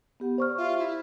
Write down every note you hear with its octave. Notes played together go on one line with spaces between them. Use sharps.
B3 G4 F#5
C5 D5 C#6 F6
F4 G4 E5 F5
E4